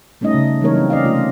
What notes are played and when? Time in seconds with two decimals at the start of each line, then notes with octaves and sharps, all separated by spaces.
0.21 G3 A3 C#4 D#4 D#5
0.34 C#3
0.61 E3 G3 A#3 D#4 A#4 C#5
0.74 F#3 G3 C4
0.90 C#4 D5 D#5 F5
1.05 C3 A3 F4 D#5